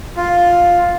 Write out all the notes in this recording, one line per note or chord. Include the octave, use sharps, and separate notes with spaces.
F4